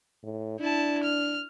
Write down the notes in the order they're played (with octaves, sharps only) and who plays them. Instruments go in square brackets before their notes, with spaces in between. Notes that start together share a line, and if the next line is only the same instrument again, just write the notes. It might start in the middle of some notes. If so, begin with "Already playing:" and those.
[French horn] A2
[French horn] D4 [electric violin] E4 A5
[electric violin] F6